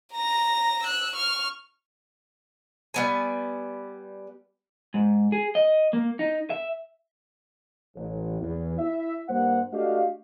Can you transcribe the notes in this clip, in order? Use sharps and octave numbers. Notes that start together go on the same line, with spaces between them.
A#5 A#6
E6 F#6
C#6 F6
G3 B3 G#5
G#2
G#4
D#5
A#3
D#4
E5
A1
E2
E4 E5
G2 A#3 C5 F#5
A3 D4 F#4 G4 D#5 F5